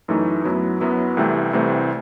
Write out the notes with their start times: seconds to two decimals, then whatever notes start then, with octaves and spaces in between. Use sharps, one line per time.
0.08 F#2 E3 A3 D#4
0.45 F#2 F#3 B3 E4
0.80 F#2 F#3 B3 E4
1.17 C2 C3 E3 A3 C4
1.53 C2 C3 E3 A3 C4